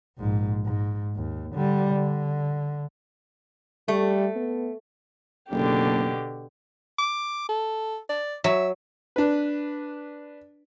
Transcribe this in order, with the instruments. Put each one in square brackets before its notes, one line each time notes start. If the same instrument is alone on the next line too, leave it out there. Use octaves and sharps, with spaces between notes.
[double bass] A#1 G#2
G#2
D#2
D3 G3
D3
[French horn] G3 [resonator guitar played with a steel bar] A3
[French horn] B3
[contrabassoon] F#1 [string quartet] B2 D3 G4
[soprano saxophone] D6
A4
D5
[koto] F#3 [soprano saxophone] E5
[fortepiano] D4 B4